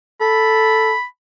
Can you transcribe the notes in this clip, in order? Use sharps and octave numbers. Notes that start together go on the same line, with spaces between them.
A4 B5